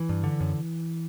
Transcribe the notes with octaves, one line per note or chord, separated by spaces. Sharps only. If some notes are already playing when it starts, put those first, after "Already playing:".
Already playing: E3
G2
D3
F#2